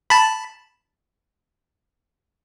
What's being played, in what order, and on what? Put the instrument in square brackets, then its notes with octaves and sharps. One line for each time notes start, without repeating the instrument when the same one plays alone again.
[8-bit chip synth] A5 B5